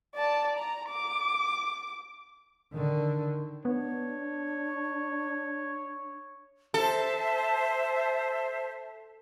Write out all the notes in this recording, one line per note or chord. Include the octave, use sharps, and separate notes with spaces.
D5 A5
A#5
D6
D3 D#3
B3 D4 C#5
A4 C5 E5 A5